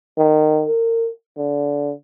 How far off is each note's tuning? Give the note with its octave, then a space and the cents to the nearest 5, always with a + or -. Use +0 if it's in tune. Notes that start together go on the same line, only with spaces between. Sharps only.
D#3 -20
A#4 -30
D3 -25